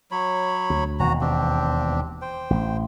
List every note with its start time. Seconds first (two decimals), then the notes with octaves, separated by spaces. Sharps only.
0.11 F#3 C#5 B5
0.70 D2
1.00 E1 D#2 B2 F#4 A#5
1.21 C4 D4 G4
2.22 C5 G5
2.50 A1